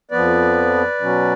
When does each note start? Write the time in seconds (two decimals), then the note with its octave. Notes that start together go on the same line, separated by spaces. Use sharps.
0.11 F2 F3 B3 B4 D5
1.01 B2 F#3 C#4